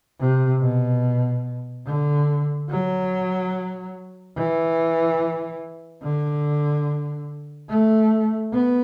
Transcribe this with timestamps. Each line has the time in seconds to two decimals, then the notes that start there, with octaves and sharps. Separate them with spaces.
0.20 C3
0.61 B2
1.86 D3
2.70 F#3
4.36 E3
6.02 D3
7.69 A3
8.53 B3